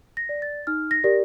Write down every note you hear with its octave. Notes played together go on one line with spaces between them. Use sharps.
A#6
D5
A6
D#4 F6
A#6
G4 A#4 D5